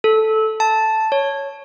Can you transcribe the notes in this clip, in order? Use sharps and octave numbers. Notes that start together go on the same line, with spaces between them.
A4
A5
C#5